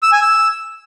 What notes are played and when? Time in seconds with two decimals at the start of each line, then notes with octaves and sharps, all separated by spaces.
0.03 E6
0.12 G#5
0.22 E6